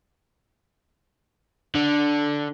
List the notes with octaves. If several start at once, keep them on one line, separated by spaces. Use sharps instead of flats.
D3